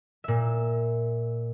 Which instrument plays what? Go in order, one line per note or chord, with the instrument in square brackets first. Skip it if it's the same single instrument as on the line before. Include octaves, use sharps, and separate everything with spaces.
[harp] A#2 E5